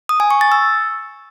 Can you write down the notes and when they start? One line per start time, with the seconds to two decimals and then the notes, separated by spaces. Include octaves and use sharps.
0.09 D#6
0.20 G#5
0.30 C#6
0.41 A6
0.52 E6